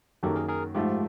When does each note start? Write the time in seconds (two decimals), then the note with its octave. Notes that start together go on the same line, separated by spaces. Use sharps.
0.23 F#2 D#3 F#3 A#3 G4 A4
0.36 G#4 A#4
0.48 G#4 A#4
0.75 G#2 F3 A3 F4 G4